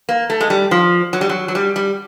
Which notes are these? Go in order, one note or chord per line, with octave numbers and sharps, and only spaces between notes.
A#3
A3
G#3
G3
F3
F#3
G3
F#3
F#3
G3
G3